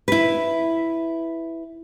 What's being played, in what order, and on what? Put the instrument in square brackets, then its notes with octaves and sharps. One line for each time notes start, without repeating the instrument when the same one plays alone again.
[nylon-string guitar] E4 B4